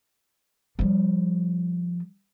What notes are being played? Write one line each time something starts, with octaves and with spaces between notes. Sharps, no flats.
F3 G3